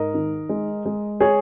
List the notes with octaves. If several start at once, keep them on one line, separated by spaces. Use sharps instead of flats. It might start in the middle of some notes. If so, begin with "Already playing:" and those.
Already playing: G#2 A#4 D#5
D#3
G#3
G#3
G#4 C#5